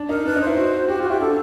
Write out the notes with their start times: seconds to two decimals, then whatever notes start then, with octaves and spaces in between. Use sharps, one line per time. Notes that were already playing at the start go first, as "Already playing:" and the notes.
Already playing: D4
0.09 D#4 A#4
0.26 D4 B4
0.36 D#4
0.41 C5
0.47 E4
0.57 F#4
0.88 F#4 G4
0.99 F4
1.03 F#4
1.10 E4 G4
1.20 D4 A4